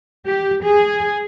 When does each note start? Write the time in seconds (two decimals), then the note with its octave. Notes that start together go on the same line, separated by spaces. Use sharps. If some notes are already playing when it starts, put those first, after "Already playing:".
0.25 G4
0.63 G#4